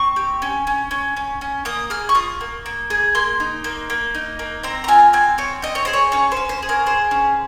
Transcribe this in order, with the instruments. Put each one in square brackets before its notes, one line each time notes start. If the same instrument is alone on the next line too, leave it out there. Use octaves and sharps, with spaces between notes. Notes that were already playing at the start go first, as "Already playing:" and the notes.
Already playing: [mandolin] C4 C#6
G4
C#4
C#4
C#4
C#4
C#4
A#3 D#6
G#4 F6
C#6
F4 D#6
A#3
A#3
G#4
A#3 C6
D#4
A#3
A#3
D#4
A#3
C4 A#5
A#5
F4 G#5
C4 G#5
C4 C#5
C4 D#5
C#5
G#4 C5
C#5
C#4 C#5
C5
C#4
C5
G#4
A#4
G#4 C5
C#4